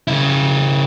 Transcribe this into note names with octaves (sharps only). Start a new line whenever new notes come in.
C#3 E4